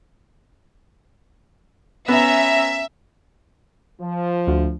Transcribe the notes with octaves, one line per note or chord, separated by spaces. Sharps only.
B3 C#4 E5 A#5
F3
D2